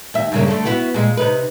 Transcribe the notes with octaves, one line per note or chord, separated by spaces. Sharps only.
D#2 E5
G2 C#3 A#3
D3 A3
B3 E4 F#4
A#2 G#3
C3 D#4 B4